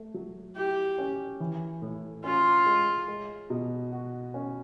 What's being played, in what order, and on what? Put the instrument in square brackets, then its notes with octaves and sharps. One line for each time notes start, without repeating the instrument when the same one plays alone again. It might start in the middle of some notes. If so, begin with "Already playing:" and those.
Already playing: [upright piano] A3
F#3
[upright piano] E4 [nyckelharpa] G4
[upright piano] C#4
E3
A2
[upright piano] C#4 [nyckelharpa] F4
[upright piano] G#3
G#3
B2
F#4
C#4